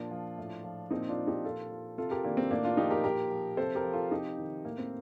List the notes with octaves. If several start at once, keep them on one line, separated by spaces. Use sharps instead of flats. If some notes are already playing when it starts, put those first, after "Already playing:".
Already playing: A#2 F3 D4 F4
F3
A2
F3
A#2 C4 D#4
D4 F4
F3
D#4 G4
A#2 F4 A4
F3
C3 F4 A4
G4 A#4
D#3 A#3 D4
C4
A2 A#3 D4
D4 F4
F3 D#4 G4
G4 A#4
A#2 G4 A#4
F3
C3 A4 C5
G4 A#4
F3
F4 A4
C3 D#4 G4
D#3
A2 A#3
C4